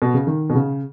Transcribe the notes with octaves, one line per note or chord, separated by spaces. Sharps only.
B2
C#3
D#3
B2
C#3